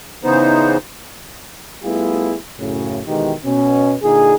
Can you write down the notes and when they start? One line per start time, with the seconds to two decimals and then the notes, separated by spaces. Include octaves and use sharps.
0.24 C#3 E3 B3 D#4 C5
1.84 G3 A3 B3 E4 F4 G#4
2.59 F#2 A2 C#3
3.07 B2 D#3 E3 G#3 D#4 G4
3.45 B2 C#4
4.03 A#2 D3 D#4 G#4